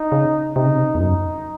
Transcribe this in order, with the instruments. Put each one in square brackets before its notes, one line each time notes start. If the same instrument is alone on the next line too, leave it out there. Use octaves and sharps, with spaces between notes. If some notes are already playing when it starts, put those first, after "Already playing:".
Already playing: [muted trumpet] D#4
[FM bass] C#3
[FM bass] C3 [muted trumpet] D#4
[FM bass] C#3
C3
E2
[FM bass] F#2 [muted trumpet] D#4